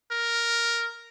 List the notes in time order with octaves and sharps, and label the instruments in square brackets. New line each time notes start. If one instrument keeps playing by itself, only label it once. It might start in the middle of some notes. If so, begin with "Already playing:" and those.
[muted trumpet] A#4